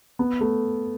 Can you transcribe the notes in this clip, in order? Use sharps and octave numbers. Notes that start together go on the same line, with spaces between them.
B3
A3